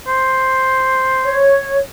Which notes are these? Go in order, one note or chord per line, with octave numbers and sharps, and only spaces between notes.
C5
C#5